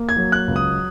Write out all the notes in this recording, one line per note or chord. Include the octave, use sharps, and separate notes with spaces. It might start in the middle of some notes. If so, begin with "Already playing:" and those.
Already playing: A#3
G#6
F#3
F#6
C#2
D#6